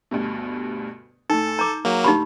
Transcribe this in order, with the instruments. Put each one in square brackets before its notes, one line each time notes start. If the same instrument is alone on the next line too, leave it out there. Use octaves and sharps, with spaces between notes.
[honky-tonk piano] D2 G2 B2
[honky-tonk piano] A2 G#5 [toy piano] D#4 [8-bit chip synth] A4
[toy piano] A#5 D6 [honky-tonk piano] G6
[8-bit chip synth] F#3 A#3 [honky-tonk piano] G#4
[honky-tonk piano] A2 D3 [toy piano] D#4 G4 B5